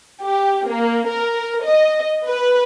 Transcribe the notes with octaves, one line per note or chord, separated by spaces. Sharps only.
G4
A#3
A#4
D#5
B4